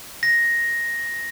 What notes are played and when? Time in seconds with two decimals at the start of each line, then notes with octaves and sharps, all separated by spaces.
0.23 A#6